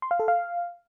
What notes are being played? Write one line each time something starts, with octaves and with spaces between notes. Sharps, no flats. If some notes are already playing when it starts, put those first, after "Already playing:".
C6
F5
A4
F5